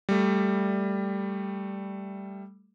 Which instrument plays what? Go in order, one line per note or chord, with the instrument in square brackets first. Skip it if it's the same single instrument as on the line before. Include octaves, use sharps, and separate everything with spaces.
[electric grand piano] G3 A3